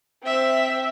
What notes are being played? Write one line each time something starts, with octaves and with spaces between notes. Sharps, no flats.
C4 E5